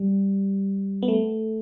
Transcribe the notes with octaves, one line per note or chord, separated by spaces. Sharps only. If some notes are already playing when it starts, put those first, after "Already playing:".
Already playing: G3
B3
A3